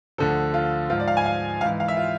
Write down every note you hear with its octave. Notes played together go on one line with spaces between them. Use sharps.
D2 D3 F3 A4
F4
G#2 F3 F4
D5
F5
G#5
F5
G#2 E3 F5
F5
E5
F4